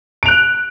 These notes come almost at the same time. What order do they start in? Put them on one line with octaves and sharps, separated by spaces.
D7 F7 F#6